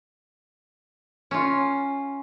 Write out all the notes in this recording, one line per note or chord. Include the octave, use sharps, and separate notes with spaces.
C#4 F4